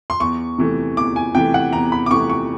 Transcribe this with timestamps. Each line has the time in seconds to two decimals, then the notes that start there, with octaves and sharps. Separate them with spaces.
0.10 C6
0.20 E2 C#6
0.58 C3 E3 A3
0.97 E2 D6
1.16 G#5
1.35 C3 E3 A3 G5
1.54 F#5
1.73 E2 A#5
1.92 B5
2.06 D6
2.11 C3 E3 A3 C#6
2.30 C#6